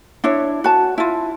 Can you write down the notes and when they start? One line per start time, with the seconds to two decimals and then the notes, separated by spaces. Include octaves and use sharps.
0.24 D4 E4 C#5
0.64 F#4 A5
0.98 E4 F4